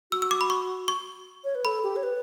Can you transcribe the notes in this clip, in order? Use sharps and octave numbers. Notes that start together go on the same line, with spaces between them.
F#4 E6
E6
D6
B5
C#6
C#6
C#5
B4
A4 B5
G4
C#5
B4